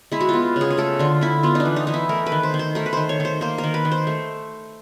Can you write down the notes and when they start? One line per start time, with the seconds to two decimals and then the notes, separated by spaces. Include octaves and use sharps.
0.12 G#3 E4
0.21 F#4
0.29 B3 F4
0.56 C#3 G#4
0.70 G#4
0.77 A3 A4
0.99 D3 F4
1.21 D3 E4
1.43 B3 F4
1.55 D4 D#4
1.65 E3
1.76 D#4
1.87 E3 D#4
1.94 E4
2.09 A3 A#4
2.26 B4
2.32 D#3
2.43 C5
2.54 D#3
2.59 C5
2.75 A3 A#4
2.86 B4
2.93 D#3 C5
3.09 C#5
3.20 D#3
3.25 C5
3.41 A#3 C5
3.58 A#4
3.64 D#3
3.74 B4
3.85 D#3
3.92 C5
4.07 A3